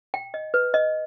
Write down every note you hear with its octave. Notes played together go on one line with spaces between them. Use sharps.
G5
D#5
B4
D#5